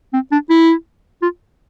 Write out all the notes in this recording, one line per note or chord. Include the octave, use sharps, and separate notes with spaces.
C4
D4
E4
F4